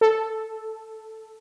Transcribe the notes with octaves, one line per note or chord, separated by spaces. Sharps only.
A4